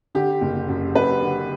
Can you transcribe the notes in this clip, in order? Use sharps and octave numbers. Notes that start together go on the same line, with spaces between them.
D3 G4
F#1
F#2
F#1 B4
D3